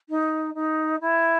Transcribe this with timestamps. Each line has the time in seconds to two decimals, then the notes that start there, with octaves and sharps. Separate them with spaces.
0.09 D#4
0.54 D#4
1.00 E4